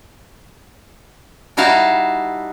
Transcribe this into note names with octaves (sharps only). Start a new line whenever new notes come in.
G3 D#4 E4 F#4 F5 A5